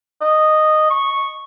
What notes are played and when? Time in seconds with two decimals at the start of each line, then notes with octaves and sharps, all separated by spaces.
0.21 D#5
0.90 C#6